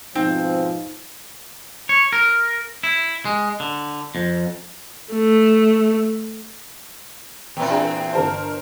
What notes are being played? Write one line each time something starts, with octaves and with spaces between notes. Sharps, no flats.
G#2 B2 F3 C4 D#4
C#5
A#4
E4
G#3
D3
F2
A3
E2 A#2 C4 G5
D4 G#4 G5
G1 A#4 C5 A5